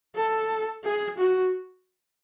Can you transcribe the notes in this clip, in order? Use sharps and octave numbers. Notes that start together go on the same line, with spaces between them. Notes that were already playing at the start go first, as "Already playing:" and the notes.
A4
G#4
F#4